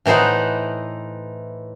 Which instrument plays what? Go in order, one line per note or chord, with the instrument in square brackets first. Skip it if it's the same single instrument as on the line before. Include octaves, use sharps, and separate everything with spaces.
[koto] A2 E3 D#4 C5 F#5